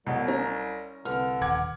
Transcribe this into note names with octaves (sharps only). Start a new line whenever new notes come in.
C2 B2 F#3
C#4 A#5
C2 D3 B4 F6
D#1 F#5 D6 G#6